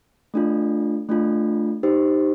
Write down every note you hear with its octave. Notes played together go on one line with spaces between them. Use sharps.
A3 D4 F4
A3 D4 F4
D#4 G4 C5